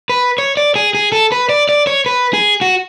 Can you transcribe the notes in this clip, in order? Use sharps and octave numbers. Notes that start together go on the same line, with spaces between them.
B4
C#5
D5
G#4
G#4
A4
B4
D5
D5
C#5
B4
G#4
F#4